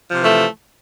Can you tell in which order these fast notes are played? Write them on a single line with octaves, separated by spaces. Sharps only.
F3 C3 E3 A3